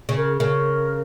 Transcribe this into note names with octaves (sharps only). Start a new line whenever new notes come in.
C#3
A#4
C#3 A#4